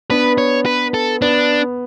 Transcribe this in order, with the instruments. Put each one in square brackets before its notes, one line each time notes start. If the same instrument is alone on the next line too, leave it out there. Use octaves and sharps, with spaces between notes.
[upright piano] B3 D4 [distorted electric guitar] B4
[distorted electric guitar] C#5
B4
A4
[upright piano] B3 [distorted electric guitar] D4